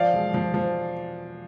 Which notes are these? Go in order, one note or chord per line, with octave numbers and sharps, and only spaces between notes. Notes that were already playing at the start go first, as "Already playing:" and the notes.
Already playing: F3 D5 F5
E1
F3
F3